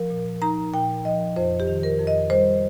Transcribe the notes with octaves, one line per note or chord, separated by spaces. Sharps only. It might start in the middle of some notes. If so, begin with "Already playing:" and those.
Already playing: F3 A#4
A#2
D#4 A#5
A#2 G5
F3 D#5
F2 C5
G4
D#3
A#4
F2
D#5
G3 C5